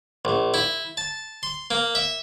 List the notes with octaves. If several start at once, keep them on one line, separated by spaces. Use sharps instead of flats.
A#1
E4
A5
C6
A#3
E5